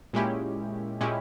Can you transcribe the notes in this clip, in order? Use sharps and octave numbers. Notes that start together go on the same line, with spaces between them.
A#2 G#3 C#4 E4 G4
A#2 G#3 C#4 E4 G4